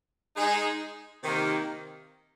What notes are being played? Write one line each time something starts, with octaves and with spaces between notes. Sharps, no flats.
G#3 D#4 G#4
C3 D#3 A#3